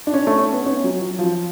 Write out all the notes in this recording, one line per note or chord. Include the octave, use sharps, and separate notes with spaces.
D4
C#4
A3
C#4
B3
C#4
F#3
F#3
F3